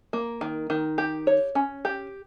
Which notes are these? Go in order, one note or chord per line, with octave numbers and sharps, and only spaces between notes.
A#3
D#3
D#3
G4
C#5
C#4
G4